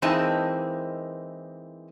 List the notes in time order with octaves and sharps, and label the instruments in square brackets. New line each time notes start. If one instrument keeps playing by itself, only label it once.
[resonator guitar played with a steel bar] E3 G#3 A#3 C4 D#4 A5